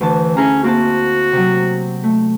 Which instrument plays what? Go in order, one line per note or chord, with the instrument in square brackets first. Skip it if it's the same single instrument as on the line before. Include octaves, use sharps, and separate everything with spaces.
[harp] D2 A5 [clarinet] E3
[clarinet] C#4 [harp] E4 G#4 A#5
[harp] A#3 C4 A5 [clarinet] F#4
[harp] C3 F#3
A3